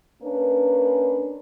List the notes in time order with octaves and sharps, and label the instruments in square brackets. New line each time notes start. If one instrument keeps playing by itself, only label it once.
[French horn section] A#3 C#4 D4 B4